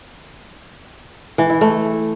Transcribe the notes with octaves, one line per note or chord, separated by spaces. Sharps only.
E3
E4
A3